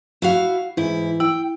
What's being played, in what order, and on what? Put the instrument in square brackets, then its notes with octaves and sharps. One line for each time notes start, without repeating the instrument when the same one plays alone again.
[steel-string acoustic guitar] E4 F#4 F5
[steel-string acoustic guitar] G#2 E4 [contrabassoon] E3
[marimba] E4 [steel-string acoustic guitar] G5